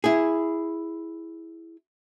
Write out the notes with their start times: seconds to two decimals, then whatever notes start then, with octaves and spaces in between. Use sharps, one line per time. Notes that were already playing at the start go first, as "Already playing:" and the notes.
0.04 E4 G#4